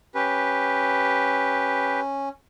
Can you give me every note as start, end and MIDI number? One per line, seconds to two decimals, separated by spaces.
0.15 2.29 61
0.15 2.01 67
0.15 2.01 71